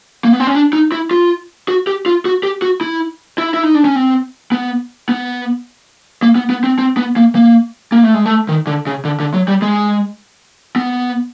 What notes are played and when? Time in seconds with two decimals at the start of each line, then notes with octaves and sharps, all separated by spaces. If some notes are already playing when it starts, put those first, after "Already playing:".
0.24 A#3
0.33 B3
0.39 C4
0.47 C#4
0.55 D4
0.73 D#4
0.92 E4
1.11 F4
1.68 F#4
1.87 G4
2.06 F4
2.25 F#4
2.43 G4
2.62 F#4
2.81 E4
3.38 E4
3.54 E4
3.63 D#4
3.75 D4
3.85 C#4
3.96 C4
4.52 B3
5.09 B3
6.22 A#3
6.35 B3
6.50 B3
6.64 C4
6.79 C4
6.97 B3
7.16 A#3
7.35 A#3
7.92 A#3
8.04 A3
8.14 G#3
8.26 A3
8.49 D#3
8.67 D3
8.87 C#3
9.05 D3
9.20 D3
9.34 F#3
9.48 G3
9.62 G#3
10.76 B3